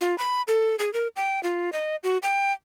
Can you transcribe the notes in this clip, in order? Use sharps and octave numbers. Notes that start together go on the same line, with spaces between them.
F4
B5
A4
G#4
A#4
G5
F4
D#5
F#4
G5